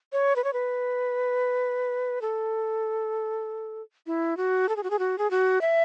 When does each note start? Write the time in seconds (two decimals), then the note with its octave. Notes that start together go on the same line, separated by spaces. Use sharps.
0.13 C#5
0.36 B4
0.44 C#5
0.53 B4
2.22 A4
4.07 E4
4.37 F#4
4.69 A4
4.76 G#4
4.83 F#4
4.90 G#4
4.99 F#4
5.18 G#4
5.31 F#4
5.61 E5